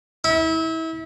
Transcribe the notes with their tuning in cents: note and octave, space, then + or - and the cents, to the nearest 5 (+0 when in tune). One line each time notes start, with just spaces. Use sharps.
E4 -30